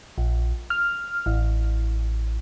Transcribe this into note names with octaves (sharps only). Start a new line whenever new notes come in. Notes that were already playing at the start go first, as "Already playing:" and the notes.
A#1
F6
A1